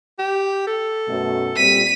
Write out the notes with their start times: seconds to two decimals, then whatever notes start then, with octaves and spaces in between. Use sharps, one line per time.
0.19 G4
0.67 A4
1.08 F#2 B2 A3
1.56 A#2 G3 C4 B6 D#7